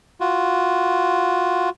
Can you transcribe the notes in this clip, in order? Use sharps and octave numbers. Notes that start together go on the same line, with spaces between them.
F4 F#4